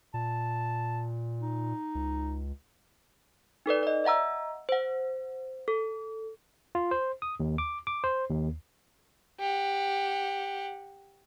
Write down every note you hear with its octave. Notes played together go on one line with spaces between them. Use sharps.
A#2 A5
D#4
C#2
D#4 A4 B4 D5
D5 D#5
D#5 E5 F#5 A#5 E6
C5 F#5
A4
F4
C5
D#6
D#2
D6
D6
C5
D#2
G4 F#5